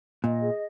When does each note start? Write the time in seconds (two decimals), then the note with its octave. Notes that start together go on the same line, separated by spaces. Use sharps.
0.24 A#2 D#5
0.42 G#4